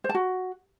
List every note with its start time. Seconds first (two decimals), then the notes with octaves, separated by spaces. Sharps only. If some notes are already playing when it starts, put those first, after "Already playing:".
0.04 C5
0.09 A5
0.15 F#4